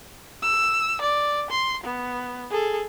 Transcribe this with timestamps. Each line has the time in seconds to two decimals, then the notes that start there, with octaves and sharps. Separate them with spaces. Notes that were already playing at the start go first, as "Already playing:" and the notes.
0.43 E6
1.01 D5
1.51 C6
1.84 B3
2.50 G#4 A4